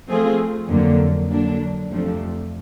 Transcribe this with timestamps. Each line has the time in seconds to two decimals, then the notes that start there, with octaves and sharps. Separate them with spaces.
0.08 F3 A3 C4 F4 G#4
0.68 F2 D3 F#3 A#3
1.30 D3 F#3 A#3 D4
1.90 F2 C3 F3 A3 D4